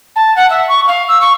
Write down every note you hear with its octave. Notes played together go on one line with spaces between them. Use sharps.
A5
F#5
E5
C#6
F5
E6
C#6